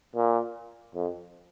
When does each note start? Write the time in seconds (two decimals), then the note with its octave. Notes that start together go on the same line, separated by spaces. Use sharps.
0.16 A#2
0.95 F2